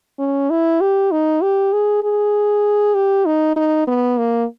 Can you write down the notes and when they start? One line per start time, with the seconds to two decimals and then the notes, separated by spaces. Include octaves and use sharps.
0.19 C#4
0.50 E4
0.81 G4
1.12 D#4
1.43 G4
1.73 G#4
2.03 G#4
2.95 G4
3.26 D#4
3.56 D#4
3.87 B3
4.18 A#3